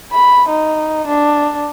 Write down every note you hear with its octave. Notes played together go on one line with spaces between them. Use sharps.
B5
D#4
D4